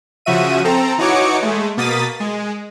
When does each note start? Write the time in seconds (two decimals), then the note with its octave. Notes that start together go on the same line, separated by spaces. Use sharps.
0.25 C#3 F3 F#4 E5 D#7
0.64 C4 A4 A#5
0.98 E3 D#4 F#4 C#5 D6 C#7
1.42 G#3 A3
1.77 B2 A#3 D#6 A6 B6
2.20 G#3